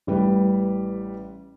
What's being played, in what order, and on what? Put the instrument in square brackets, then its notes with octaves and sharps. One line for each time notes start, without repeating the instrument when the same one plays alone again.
[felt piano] A1 G3 B4